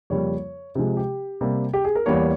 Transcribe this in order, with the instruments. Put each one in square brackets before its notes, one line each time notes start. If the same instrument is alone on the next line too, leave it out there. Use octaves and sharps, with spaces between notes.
[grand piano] F2 C#3 G3 A#3 C#5
C3 F3 G#3
G4
C3 G3 A#3
G4
G#4
A#4
E2 E3 G3 A#3 C#5